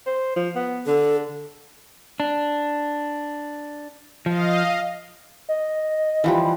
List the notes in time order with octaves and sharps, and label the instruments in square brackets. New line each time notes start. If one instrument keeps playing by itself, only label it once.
[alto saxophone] C5
F3
B3
[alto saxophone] D3 [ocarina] A4
[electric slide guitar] D4
[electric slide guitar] F3 [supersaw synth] D#5 F5
[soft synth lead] D#5
[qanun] E3 F3 G3